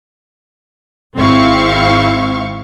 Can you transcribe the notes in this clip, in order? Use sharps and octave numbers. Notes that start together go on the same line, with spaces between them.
G#1 C4 E4 F5 C#6